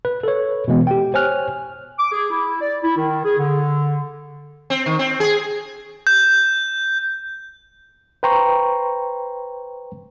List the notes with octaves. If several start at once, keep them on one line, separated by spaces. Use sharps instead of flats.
B4
A4 B4 C#5
B2 E3 G#3 B3
G4 G5
C5 C#5 G#5 F6 F#6
D6
G#4
E4
D5
E4
D#3
G#4
D3
C4
D#3
C4
G#4
G6
B4 C5 G5 A#5 C6 C#6